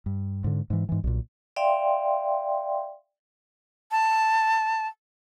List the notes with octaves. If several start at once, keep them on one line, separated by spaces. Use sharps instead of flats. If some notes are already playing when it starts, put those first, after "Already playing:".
G2
G#2 D3
G#2 E3
G#2 E3
B1 A#2
D5 E5 F5 G5 C6
A5